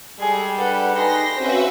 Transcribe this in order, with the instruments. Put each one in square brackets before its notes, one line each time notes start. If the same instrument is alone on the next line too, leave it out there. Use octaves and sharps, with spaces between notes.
[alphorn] G3 [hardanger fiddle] G#3 G#4 [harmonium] A4
[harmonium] D4 B4 F#5 [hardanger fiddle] A4
[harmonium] D#4 G#4 B4 [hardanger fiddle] G4 C6 [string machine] A#6
[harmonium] C#3 C4 C#4 [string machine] F#4 B4 E5 [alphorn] C5